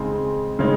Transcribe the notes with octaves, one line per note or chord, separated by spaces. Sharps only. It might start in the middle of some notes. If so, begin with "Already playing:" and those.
Already playing: C#3 G#3 C4 D#4
C#3 G#3 C4 D#4